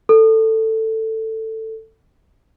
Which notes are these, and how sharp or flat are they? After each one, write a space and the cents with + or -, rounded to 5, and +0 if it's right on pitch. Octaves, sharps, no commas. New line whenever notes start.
A4 +15